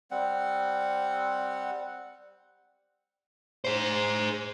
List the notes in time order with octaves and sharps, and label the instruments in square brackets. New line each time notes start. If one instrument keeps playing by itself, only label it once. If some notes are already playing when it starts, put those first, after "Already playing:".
[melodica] G3 C4 F#5
[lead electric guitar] G#4 C5